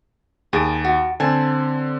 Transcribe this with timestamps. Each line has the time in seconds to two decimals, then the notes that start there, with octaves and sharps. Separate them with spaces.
0.53 D#2 G#4 A6 D7
0.85 F#4
1.20 D3 C4 G#5 A5